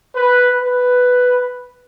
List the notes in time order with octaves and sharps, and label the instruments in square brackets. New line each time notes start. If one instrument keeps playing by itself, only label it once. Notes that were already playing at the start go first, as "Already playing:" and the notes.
[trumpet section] B4
B4